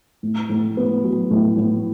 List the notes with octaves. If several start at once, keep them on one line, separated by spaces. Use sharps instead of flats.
A2
A2
B3
F#3
A2
A2